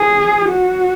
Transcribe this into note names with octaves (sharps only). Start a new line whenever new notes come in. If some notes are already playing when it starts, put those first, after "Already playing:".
Already playing: G#4
F#4